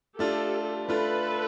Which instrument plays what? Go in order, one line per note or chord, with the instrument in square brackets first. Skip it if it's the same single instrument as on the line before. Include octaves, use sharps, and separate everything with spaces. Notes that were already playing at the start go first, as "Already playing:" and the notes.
[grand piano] A3 D4 F4 [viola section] G4 A4
[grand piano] A3 D4 F4 [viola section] A4 B4